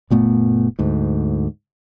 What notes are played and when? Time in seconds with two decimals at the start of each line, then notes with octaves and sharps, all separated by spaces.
0.10 F#1 A#2 A3 B3
0.79 D2 G#2